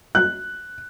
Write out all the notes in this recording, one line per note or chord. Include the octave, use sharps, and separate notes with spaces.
F#6